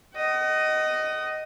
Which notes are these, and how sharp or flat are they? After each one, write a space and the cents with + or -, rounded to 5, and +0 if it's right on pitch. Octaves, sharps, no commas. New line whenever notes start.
D#5 +0 F#5 +40